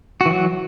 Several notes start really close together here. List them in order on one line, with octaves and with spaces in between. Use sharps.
F#4 E3 F#3